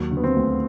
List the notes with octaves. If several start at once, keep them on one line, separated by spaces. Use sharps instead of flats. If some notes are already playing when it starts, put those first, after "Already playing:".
Already playing: D#2 F#3
D3
B3
C4
D2